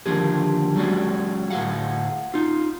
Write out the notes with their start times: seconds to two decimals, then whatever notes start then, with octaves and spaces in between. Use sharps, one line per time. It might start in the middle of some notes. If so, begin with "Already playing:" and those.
0.06 D3 D#3 F3 A#3 G4 G#4
0.76 F#3 G#3 C#4 F#4 G#4 D5
1.50 D2 A2 C4 G#4 F5 F#5
2.34 D#4 F4